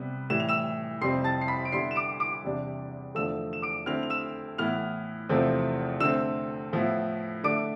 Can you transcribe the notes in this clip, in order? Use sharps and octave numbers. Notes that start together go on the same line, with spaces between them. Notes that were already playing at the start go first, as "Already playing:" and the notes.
Already playing: C3 G3 B3
A2 E3 G3 E7
F7
E6 E7
F2 C3 G3 C4 C6 C7
A5 A6
C7
B5 B6
D7
D3 G3 B3 E4 C6 C7
E7
D6 D7
D6 D7
E2 C3 G3 D4
E2 D3 F3 A3 E6 E7
E7
D6 D7
D3 A3 C4 E4 F6 F7
F7
E6 E7
A2 E3 B3 E4 F6 F7
E2 C3 F3 A3 C4
D3 A3 C4 E6 E7
A2 F3 B3 E4
D3 A3 D4 D6 D7